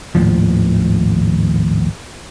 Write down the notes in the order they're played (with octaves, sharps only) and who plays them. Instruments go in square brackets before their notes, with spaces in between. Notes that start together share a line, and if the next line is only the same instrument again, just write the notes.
[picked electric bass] G#1 D#2 A2 F3